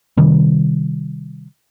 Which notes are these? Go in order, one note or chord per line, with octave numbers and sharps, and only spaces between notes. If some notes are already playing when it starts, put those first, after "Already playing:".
C3 D#3 G3